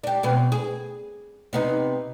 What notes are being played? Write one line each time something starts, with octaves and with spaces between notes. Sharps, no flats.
D4 G4
B2 B3 C4
G#4
C3 B3 D#4